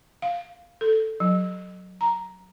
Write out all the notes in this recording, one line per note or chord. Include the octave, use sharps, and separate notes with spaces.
F5
A4
F#3
A#5